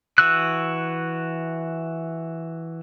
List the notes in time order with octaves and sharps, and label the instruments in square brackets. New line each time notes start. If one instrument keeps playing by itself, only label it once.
[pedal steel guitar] E3 F#4 E6 F#6